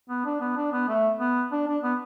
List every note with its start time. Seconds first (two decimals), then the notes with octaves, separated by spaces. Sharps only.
0.10 B3
0.25 D4
0.41 B3
0.57 D4
0.73 B3
0.88 A3
1.20 B3
1.52 D4
1.67 D4
1.83 B3